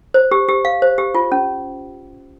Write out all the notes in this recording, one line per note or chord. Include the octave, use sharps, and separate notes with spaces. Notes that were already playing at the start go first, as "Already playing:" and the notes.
C5
G4
G4
F5
C5
G4
F4
C#4